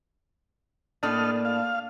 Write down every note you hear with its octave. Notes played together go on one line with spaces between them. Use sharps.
A2 A#3 D4 A4 D#5 F6
F5